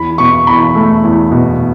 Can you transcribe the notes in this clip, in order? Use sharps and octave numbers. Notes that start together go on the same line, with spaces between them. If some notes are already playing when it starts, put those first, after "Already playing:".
Already playing: E2 B5
B2 C#6
E2 B5
A3
E2
B2